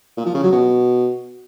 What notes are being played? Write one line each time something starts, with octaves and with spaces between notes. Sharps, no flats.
A#2
F3
C#3
F#3
B2